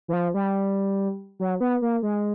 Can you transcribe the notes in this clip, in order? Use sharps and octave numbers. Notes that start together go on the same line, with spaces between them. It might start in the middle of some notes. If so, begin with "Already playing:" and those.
E3
F3
G3
F#3
B3
A#3
G#3